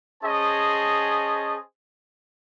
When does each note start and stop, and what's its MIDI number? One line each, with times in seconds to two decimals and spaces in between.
0.24 1.57 61
0.24 1.57 68
0.24 1.57 72
0.24 1.57 75
0.24 1.57 81